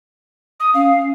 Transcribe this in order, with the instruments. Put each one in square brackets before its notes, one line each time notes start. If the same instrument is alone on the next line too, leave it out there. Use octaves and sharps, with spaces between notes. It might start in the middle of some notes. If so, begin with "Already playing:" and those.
[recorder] D#6
[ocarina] C#4 [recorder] F5